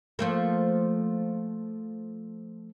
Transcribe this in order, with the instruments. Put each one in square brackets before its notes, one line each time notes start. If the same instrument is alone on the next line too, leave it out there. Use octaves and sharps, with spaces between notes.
[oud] F3 A3 A#3